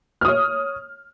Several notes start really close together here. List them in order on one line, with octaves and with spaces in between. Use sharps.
F6 D#6 C#5